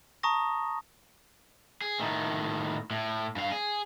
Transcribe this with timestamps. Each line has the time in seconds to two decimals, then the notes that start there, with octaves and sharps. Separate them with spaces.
0.23 A5 A#5 C#6 D#6 A#6
1.82 G#4
2.00 A2 D#3
2.91 A2
3.36 G2 F5
3.52 G#4